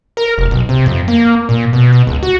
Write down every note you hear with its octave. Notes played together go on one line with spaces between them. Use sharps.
A#4
F1
B1
C3
F2
A#3
A#2
B2
B2
C#2
F#4